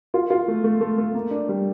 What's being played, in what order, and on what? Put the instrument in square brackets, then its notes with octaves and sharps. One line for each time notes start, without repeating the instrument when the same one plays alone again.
[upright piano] F4
F4
A3
A3
A3
A3
A#3
D4
G3